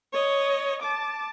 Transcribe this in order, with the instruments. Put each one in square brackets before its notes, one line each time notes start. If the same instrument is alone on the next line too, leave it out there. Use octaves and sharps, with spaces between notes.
[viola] C#5 D#5
A5 D6